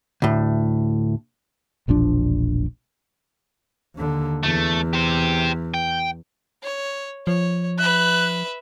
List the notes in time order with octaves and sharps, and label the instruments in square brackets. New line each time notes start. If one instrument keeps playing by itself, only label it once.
[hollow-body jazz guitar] D2 A2
[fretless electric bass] E1 A#1 F3 D4
[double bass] D#2 D3
[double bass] E2 [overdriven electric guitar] A3
[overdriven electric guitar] G4 C5
G5
[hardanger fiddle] C#5
[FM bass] F3 [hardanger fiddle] C#5
[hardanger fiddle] B4 E5 [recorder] F#6